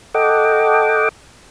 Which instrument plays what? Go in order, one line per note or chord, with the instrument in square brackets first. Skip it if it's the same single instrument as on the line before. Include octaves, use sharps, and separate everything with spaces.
[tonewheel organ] A4 D#5 F#5 G5 D6